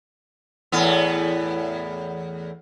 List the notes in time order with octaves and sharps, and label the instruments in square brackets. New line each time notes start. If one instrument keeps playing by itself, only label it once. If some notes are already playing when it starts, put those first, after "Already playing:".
[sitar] E2 A2 B3